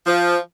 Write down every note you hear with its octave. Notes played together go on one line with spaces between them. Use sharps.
F3